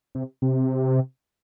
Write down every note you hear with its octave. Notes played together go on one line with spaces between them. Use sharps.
C3
C3